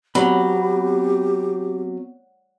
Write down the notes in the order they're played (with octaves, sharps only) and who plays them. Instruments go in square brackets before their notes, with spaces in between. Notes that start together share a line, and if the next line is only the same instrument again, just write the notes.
[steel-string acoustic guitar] F#3 [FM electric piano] B3 C4 [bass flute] G4 [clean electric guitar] B5